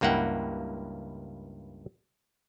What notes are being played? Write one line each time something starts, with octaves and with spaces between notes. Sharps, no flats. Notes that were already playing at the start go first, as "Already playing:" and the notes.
C#2 G2 A#3 E4 F#5 G5